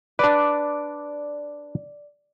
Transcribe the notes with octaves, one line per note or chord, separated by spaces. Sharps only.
D4 B4 D5